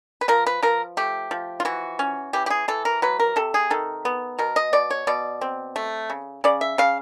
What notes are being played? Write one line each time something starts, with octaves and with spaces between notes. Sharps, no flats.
B4
F3 A#4
B4
F3 A#4
A3 G4
F3
F4
E3 F#4
C#4
E3 G4
G4
G#4
E3 A4
A#4
F#3 B4
A#4
C3 A4
G#4
D#3 A4
B3
B2 A#4
D#5
B2 D5
C#5
B2 D5
C4
A3
C#3
C#3 D5
E5
C#3 F5